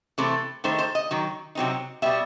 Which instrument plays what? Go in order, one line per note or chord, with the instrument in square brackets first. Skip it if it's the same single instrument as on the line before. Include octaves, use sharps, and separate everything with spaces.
[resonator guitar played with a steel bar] C3 E3 A3 C4 A4
D#3 A3 D#4 C5
C5
D#5
D#3 F#3
C3 F#3 C4 D#4
B2 G3 B3 E5